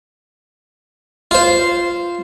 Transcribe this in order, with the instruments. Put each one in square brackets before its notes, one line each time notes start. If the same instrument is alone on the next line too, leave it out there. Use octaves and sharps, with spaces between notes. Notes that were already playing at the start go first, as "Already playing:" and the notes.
[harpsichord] F4 C5